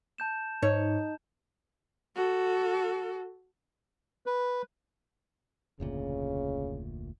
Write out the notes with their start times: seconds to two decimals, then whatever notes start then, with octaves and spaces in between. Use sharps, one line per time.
0.18 A5 G6 E7
0.62 G#2 D#4 C#5
2.16 F#4 A4
4.26 B4
5.80 F1 D2 A#2 C#3